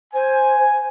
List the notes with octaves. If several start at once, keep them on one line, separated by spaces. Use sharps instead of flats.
C5 G#5